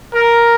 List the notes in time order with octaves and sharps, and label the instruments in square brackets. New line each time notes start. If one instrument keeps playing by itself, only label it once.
[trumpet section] A#4